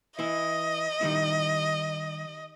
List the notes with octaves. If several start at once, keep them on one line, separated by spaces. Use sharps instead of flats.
E3 E4 D#5
D#3 G3 E4